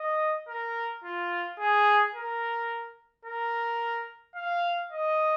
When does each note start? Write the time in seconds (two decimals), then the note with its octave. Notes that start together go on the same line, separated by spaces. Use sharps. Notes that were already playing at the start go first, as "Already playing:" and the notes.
Already playing: D#5
0.48 A#4
1.04 F4
1.59 G#4
2.14 A#4
3.25 A#4
4.35 F5
4.92 D#5